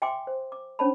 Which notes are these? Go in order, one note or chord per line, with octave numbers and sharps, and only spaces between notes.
E5 G5 G#5 C6 D6
C5
D6
C#4 D4 C5 C#5 A5 B5